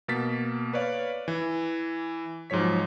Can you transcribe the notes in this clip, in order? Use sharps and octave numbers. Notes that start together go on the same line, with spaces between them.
B2 A#3 A6 B6
B4 C#5 D5 F5
E3
G#2 F3 F#3 C#5 B6